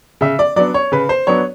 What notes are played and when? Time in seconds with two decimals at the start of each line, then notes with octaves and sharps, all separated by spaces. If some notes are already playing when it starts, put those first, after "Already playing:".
0.21 C#3 E5
0.39 D5
0.56 F#3 B3 D4 D5
0.74 C#5
0.92 C#3 B4
1.09 C5
1.27 F#3 B3 D4 C#5